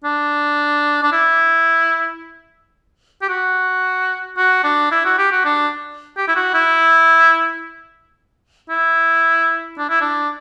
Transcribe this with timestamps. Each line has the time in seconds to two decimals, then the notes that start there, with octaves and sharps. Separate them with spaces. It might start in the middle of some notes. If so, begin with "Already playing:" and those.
0.04 D4
1.03 D4
1.12 E4
3.22 G4
3.29 F#4
4.37 F#4
4.64 D4
4.91 E4
5.05 F#4
5.18 G4
5.32 F#4
5.45 D4
6.17 G4
6.28 E4
6.36 F#4
6.54 E4
8.70 E4
9.78 D4
9.90 E4
10.01 D4